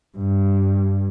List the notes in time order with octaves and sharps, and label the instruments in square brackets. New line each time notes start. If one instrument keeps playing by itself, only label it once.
[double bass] G2